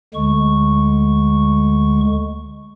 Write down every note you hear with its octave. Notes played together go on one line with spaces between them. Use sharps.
D2 D3 G#3 C#6